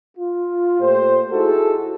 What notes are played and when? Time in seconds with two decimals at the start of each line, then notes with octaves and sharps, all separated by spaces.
0.18 F4
0.81 A#2 A3 G4 C5
1.32 D#4 E4 F#4 G#4 A4